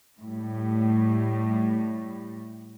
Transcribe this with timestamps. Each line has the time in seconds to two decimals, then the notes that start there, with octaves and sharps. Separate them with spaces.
0.21 A2 G3